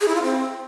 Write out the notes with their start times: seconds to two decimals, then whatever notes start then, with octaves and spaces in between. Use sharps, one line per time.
0.01 G#4
0.08 E4
0.15 F4
0.23 C4